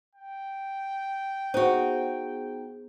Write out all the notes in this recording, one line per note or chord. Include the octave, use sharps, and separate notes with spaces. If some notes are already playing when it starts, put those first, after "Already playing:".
G5
B3 D#4 F#4 G#4 C5